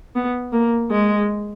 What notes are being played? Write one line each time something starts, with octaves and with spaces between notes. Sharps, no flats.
B3
A#3
G#3